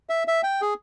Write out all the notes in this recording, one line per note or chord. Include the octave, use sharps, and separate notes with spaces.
E5
E5
G5
G#4